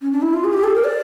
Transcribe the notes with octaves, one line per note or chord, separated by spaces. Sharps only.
C#4
D4
E4
F4
G#4
G4
A4
A#4
D5